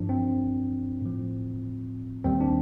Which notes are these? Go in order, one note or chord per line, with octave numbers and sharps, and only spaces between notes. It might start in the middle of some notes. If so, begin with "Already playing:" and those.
Already playing: G2 F3 D4
C4
A2 F3
D#2 D#3 G3 C4
D4